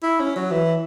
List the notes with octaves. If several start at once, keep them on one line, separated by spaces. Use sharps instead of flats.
E4
C#4
F#3
E3